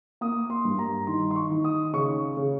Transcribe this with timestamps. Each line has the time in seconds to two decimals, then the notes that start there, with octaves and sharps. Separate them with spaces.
0.21 A#3 D#6
0.50 C6
0.65 G2
0.79 A#5
1.07 D#3 C6
1.31 C6
1.36 C#6
1.50 D#3
1.64 D#6
1.93 C#3 C#6
2.37 C#3